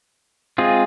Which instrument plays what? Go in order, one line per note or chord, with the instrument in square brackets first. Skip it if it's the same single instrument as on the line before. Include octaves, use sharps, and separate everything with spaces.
[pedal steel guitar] G#3 C4 F4 G#4